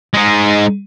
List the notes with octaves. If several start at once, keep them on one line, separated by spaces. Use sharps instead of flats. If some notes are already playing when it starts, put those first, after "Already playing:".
G#3 D#4